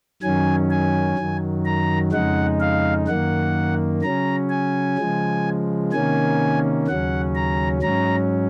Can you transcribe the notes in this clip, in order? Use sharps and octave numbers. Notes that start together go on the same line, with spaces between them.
F#2 D#3 F#3 C#4 G#5
G#5
F#2 D#3 F#3
A#5
F2 C#3 G#3 D#4 F#5
F5
F#2 D#3 A#3 F#5
C#3 F#3 C#4 A#5
G#5
C#3 F3 G#3
C3 D#3 A#3 C#4 G#5
D#2 C#3 F#3 C#4 F#5
A#5
G#2 F#3 C#4 A#5